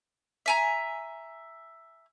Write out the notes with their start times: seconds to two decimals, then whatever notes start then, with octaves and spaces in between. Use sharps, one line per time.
0.46 E5 G#5 A#5